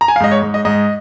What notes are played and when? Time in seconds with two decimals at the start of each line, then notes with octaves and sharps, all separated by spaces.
0.01 A#5
0.08 G#5
0.16 F5
0.20 G#2 D#5
0.31 C#5
0.42 G#2
0.54 D#5
0.65 G#2 D#5